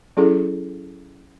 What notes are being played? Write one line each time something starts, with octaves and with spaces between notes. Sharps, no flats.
F#3 C#4 E4 G#4 A4